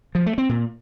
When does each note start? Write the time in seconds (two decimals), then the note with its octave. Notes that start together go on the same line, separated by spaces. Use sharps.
0.15 F3
0.26 A3
0.38 C4
0.49 A#2